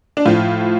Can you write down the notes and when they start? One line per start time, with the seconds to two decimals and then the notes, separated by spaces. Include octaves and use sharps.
0.17 D4
0.26 A2 F3 F4